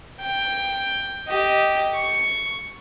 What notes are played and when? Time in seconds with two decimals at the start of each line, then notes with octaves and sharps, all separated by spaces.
0.21 G5
1.27 G4 D#5
1.95 C#6